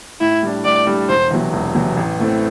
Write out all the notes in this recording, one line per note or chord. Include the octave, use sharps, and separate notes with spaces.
A2 E4
G3 D4
A2 D5
G3 D4
E1 C5
E2 C3 F#3
E1
E2 C3 F#3
A1
A2 E3 A3 C4